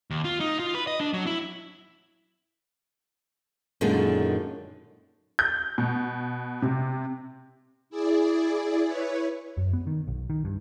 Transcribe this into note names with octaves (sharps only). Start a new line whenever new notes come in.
D#2
F4
D#4
F4
B4
D#5
D4
F#3
E4
F#2 A#2 D3 D#3 G#3 C#4
G6
B2
C3
E4 G#4 D5
E4 B4 C#5
F#2
B3
D#3
B1
D#3
G2